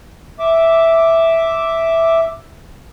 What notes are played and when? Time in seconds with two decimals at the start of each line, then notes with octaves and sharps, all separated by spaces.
0.39 E5 D6